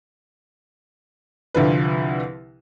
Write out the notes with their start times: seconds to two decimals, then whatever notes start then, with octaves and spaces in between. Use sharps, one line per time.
1.54 C2 D3 F3 B4